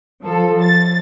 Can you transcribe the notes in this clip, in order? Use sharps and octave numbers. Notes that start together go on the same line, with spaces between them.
F3 A4
A6